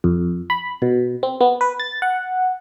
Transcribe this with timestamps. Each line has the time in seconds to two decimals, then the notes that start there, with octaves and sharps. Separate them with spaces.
0.04 F2
0.50 B5
0.82 B2
1.23 C4
1.41 B3
1.61 B4
1.80 A6
2.02 F#5